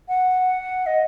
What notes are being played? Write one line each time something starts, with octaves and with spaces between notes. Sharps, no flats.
F#5
D#5